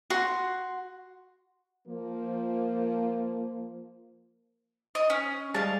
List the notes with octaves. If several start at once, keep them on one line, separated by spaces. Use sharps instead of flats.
F#4 C6
F3 A#3
D#5
C#4
G3 G#3 G#4 F5 A5